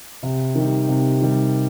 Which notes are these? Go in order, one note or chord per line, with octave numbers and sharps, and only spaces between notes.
C3
D#3 G3
C3
D#3 G3